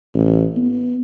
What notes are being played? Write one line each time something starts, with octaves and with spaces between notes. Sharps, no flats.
A1
B3